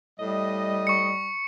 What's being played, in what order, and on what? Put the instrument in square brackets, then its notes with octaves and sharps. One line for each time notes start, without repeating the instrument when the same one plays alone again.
[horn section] A2 D#5 [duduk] G3
[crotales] C#6 C#7